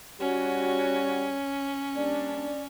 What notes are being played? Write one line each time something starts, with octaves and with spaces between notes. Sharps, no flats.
G3 C#4 F#4 C#5
G3 A#3 D4 D5